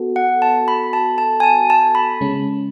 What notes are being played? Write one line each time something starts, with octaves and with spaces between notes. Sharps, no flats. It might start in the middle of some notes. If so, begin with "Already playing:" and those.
Already playing: B3 F#4 A4
F#5
A5
B5
A5
A5
G#5
A5
A5
B5
C#3 G#3 C#4